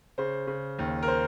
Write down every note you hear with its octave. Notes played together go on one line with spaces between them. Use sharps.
C#3 C5
C#3
D#2
A#4
C5